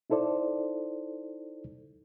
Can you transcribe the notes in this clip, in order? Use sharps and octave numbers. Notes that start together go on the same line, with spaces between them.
D#4 E4 A4 C5 D5